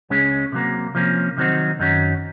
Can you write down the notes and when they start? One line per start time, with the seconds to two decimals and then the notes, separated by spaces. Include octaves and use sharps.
0.10 C#2 C#3 G#3 C#4
0.52 C3 F#3 A#3
0.95 C3 F3 A#3 C#4
1.37 C3 D#3 F#3 C4 D#4
1.79 F#2 D#3 F#3 C#4